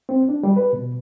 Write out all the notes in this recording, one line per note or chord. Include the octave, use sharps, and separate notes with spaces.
C4
D4
G3
B4
B2